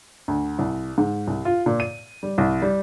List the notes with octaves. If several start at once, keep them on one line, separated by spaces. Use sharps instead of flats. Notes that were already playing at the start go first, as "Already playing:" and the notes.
D2
C2
G#2
C2
F4
A#2
D#7
G3
C2
G3